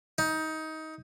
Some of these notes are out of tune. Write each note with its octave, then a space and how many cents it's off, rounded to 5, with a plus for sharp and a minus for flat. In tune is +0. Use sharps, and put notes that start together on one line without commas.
D#4 +20